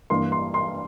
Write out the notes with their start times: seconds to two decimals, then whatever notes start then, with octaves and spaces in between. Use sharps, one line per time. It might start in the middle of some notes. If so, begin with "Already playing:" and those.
0.10 G2 E3 A#3 C6
0.32 C6
0.54 C6